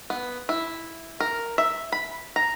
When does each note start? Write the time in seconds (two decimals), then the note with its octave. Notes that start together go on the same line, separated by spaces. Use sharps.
0.10 B3
0.49 E4
1.20 A#4
1.58 E5
1.92 B5
2.36 A#5